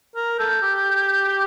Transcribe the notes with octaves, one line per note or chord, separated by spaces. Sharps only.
A#4
A4 G6
G4